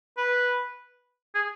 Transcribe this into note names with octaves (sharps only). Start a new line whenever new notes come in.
B4
G#4